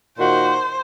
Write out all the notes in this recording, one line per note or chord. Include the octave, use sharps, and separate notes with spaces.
A#2 D#3 F#4 C5